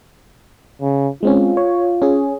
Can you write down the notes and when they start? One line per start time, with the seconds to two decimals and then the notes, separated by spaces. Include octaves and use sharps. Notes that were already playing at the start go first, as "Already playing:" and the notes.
0.81 C#3
1.23 G#3 C4 C#4 F4
1.57 C#5
2.02 C#4 G#4